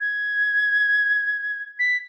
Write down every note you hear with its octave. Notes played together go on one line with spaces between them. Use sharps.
G#6
B6